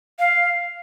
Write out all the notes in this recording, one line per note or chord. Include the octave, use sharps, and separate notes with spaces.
F5